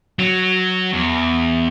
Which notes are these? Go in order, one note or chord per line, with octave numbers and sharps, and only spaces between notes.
F#3
E2